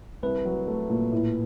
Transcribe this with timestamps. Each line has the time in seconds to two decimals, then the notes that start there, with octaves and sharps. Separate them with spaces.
0.23 C2 B4
0.45 F#3
0.67 A3
0.90 A#2
1.12 A2